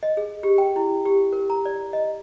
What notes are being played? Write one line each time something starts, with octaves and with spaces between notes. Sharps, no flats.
D#5
G#4
G4
G5
E4
G4
A#4
A#5
D5
D#5